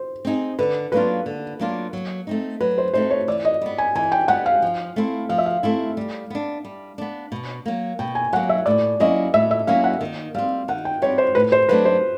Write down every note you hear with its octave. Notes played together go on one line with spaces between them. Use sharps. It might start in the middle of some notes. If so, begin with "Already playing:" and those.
Already playing: C5
C4 D#4 G#4
D3 B4
F#3 A#3 D4 F4 B4
D3
F#3 A#3 D4 F4
F#3
A3 C4 D#4
F#3 B4
C5
A3 C4 D#4 C5
C#5
E3 D5
D#5
G3 B3
G#5
E3 G#5
G5
G3 B3 F#5
F5
F3
A3 C4 E4
F3 F5
E5
F5
A3 C4 E4
G3
B3 D4
G3
B3 D4
B2
F#3 A#3
B2 G5
G#5
F#3 A#3 F#5
E5
A2 D5
F#3 A#3 C#4 E4 D#5
A2 E5
E5
F#3 A#3 C#4 E4 F5
F#5
D#3
G3 C4 F5
D#3 F#5
G5
G3 C4 C#5
C5
A2 B4
C5
F#3 A3 D4 B4
C5